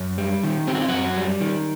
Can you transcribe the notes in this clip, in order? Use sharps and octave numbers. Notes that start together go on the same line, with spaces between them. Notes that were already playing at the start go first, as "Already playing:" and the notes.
Already playing: F#2
G3
D#3
C4 G4
F#4
F4
F#2 F#3 F#4
G3
D#3